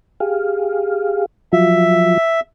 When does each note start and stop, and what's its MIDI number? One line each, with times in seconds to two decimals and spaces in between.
0.20 1.26 67
0.20 1.26 68
0.20 1.26 77
1.53 2.18 53
1.53 2.18 54
1.53 2.18 65
1.53 2.40 76